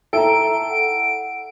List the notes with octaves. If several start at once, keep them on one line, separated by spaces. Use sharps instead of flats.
E4 A4 G5 A#5 D7
F#5